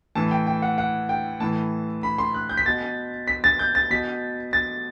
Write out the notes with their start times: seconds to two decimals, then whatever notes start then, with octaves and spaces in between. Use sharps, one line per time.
0.15 A2 E3 A5
0.31 G5
0.47 G5
0.62 F#5
0.78 F#5
1.09 G5
1.40 A2 E3 A5
2.03 B5
2.18 C6
2.34 F#6
2.49 G6
2.57 B6
2.66 B2 A6
3.28 B6
3.44 A6
3.59 G6
3.75 A6
3.90 B2 B6
4.53 A6